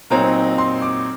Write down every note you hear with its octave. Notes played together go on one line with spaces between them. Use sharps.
A#2 F#3 C4 D#4 A#5
C6
D6